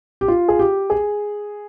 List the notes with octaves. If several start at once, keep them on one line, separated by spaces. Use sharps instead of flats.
G4
F4
G#4
G4
G#4